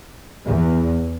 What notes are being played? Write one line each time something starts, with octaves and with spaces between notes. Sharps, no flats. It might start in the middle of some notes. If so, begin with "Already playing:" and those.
E2